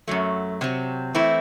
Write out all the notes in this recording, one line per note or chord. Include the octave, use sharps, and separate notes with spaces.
F#2 F#3 A3
C3 F#3 C4
E3 A3 C4 E4